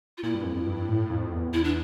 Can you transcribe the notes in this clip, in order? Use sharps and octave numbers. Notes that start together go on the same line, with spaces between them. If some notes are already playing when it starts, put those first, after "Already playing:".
F4
A#2 E4
G2
F2
F2
G2
A2
F2
E2
E2 E4
D4